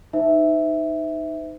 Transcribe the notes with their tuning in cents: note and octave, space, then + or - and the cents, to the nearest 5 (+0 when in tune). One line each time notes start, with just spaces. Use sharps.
D#4 +0 C5 -40 E5 -5